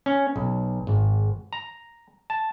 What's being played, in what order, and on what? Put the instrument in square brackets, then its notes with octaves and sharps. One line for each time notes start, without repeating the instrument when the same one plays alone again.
[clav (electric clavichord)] C#4
B1
G#1
A#5
A5